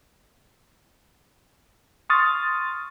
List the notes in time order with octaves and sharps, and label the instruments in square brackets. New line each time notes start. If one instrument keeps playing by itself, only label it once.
[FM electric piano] C6 C#6 D#6 F6 A6